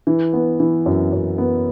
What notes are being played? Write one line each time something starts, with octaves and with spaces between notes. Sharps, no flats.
E3
B3
E3
F#2
F#2
B3